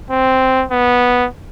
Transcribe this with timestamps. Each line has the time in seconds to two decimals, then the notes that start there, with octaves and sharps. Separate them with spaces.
0.11 C4
0.71 B3